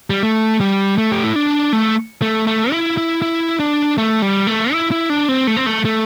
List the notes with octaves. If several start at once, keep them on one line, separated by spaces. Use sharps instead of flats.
G3
A3
G3
A3
G4
E4
D4
A3
A3
A3
E4
E4
E4
D4
A3
G3
A3
E4
E4
D4
C4
A3
C4
A3
A3